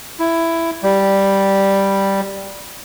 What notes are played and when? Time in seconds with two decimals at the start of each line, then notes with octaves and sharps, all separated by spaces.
0.20 E4
0.83 G3